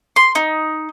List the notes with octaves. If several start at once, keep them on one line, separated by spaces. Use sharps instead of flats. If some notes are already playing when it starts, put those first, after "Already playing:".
C6
D#4